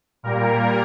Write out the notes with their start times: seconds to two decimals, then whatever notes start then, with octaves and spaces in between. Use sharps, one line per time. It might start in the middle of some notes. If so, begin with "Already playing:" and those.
0.23 A#2 G3 A#3 A#4